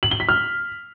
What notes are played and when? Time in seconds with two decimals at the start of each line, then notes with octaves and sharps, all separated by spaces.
0.03 F#7
0.11 G7
0.20 B6
0.29 F6